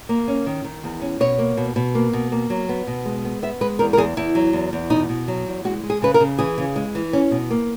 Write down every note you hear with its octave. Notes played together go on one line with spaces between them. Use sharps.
A#3
C#4
D#3
D#3
E2
C#4
B2 C#5
A#3
B2
B2
A#3
B2
A#3
F#3
B3
B2
G#3
B3
B3 E5
G#3 B4
E2 A#4
A#4
E2 G#4
E2 E4
F#3
E2
E2
B2 D#4
B2
F#3
E2
G#3 F#4
G#3
G#4
C#3 B4
A#4
C#3
E3 G#4
C#3
G#3
E3
C#4
B2
A#3